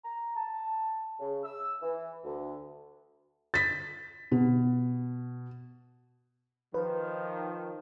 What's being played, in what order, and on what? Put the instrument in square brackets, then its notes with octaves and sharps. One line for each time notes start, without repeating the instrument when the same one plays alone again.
[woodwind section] A#5
A5
C#3
E6
E3
D2
[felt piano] A6 B6
B2
[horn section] D#3 F3 [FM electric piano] B4